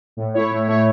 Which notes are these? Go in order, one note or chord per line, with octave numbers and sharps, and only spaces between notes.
A2
A3 E4 C#5
A2
A3 E4 C#5